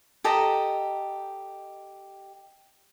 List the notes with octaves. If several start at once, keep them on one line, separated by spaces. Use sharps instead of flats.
G4 A4 D#5 A#5